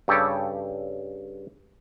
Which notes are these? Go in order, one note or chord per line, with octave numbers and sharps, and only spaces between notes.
G2 C#3 G4 A4 C#5